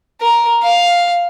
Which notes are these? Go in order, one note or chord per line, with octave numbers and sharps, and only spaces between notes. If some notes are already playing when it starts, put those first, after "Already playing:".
A#4
F5